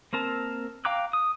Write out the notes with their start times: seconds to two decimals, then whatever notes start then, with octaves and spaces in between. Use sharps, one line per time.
0.13 A#3 C4 A#4 A5
0.85 F5 G5 A#5 D6 F#6
1.13 D#6